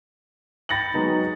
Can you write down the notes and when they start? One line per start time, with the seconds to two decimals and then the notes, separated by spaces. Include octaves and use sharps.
0.69 G5 B5 A6 A#6 C#7 F#7
0.94 F#3 G#3 B3 D#4